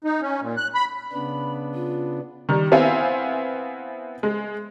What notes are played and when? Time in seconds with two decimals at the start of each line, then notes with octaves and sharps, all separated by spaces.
0.04 D#4
0.22 C#4
0.41 A#2
0.57 F#6
0.75 B5
1.12 C#3 B3 D4 B5
1.74 F4
2.49 D#3 G3
2.72 B3 C4 E4 E5 F5 G#5
4.23 G#3